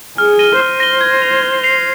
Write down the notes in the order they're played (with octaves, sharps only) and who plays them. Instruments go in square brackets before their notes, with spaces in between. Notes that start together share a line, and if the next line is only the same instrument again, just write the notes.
[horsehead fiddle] G#4 [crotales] F6
[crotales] A#6 D#7 G7
[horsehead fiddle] C5 [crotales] F6
[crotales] A#6 D#7 G7
G#6
C7 F7
G#6
C7 F7